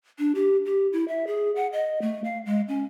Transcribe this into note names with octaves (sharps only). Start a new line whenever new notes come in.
D4
G4
G4
E4
E5
G#4
F#5
D#5
A3
F5
G#3
C#4